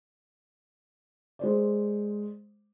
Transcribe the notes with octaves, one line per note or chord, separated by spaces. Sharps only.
G#3 C5 D5